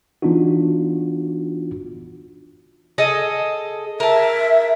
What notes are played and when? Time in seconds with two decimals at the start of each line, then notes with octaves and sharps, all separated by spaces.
0.22 E3 B3 D4 D#4 F4 F#4
2.98 G#4 A4 D#5
4.00 A#4 E5 A5